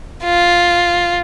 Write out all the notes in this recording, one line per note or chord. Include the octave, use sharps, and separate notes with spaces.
F4